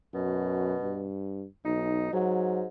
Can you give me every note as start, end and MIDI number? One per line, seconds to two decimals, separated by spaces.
0.14 0.76 42
0.14 1.06 47
0.82 1.45 43
1.65 2.12 35
1.65 2.08 63
2.13 2.68 44
2.13 2.65 54